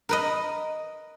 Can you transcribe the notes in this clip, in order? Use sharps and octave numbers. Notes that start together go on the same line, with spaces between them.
A#4 B4 D#5